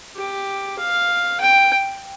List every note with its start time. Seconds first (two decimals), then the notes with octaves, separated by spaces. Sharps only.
0.16 G4
0.78 F5
1.40 G5